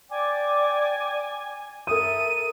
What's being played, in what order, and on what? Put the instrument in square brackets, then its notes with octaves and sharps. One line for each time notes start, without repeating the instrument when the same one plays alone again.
[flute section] D5 G5 D6 [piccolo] G#5
[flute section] A4 E5 [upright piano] A#4 D#6 [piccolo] D#7